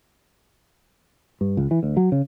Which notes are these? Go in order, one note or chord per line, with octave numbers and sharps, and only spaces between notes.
G2
C#2
E3
D2
F#3
C#3